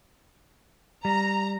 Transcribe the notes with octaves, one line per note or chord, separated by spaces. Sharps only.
G3 A#5